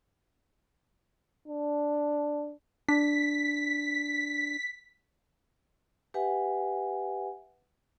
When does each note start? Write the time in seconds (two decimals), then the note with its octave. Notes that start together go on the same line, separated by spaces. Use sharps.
1.48 D4
2.89 D4 B6
6.14 G4 B4 E5 F#5 G#5